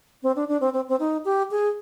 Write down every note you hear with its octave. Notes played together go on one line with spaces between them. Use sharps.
C4
D4
D4
C4
C4
C4
D#4
G4
G#4